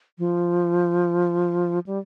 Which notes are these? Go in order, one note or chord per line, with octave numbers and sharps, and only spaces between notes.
F3
G3